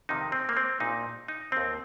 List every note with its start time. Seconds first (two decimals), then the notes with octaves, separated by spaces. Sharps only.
0.09 F2 C3 D#3 D#4
0.32 C4
0.49 A#3
0.57 C4
0.80 A#1 A#2 F3 D#4
1.28 D#4
1.52 D#2 D#3 C4